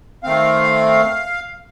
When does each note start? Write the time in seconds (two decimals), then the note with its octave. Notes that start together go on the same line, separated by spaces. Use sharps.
0.24 D#3 A3 C4 F5